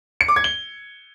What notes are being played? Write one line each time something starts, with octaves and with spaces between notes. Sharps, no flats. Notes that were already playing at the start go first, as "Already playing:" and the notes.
C#7
D6
G#6
G7